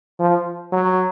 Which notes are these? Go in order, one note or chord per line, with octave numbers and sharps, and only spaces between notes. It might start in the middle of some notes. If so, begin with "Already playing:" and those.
F3
F#3